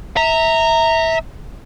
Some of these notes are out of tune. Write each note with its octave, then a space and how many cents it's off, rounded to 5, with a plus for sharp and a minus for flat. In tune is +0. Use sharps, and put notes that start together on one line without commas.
E5 -20 A#5 -15